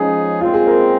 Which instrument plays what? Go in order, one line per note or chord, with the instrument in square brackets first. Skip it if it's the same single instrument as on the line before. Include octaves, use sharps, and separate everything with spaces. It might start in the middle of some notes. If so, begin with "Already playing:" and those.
Already playing: [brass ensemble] F3 G#3 D#4 G#4 [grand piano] C#4
[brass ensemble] A#2 G#3 C4 [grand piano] F4
[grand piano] G#4
A#4